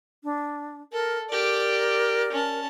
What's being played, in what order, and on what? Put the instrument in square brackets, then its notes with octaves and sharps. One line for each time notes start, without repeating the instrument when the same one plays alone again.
[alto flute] D4
[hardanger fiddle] A4 [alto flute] A#4
[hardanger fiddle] G4 D5 [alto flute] A#4
[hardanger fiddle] C#4 A5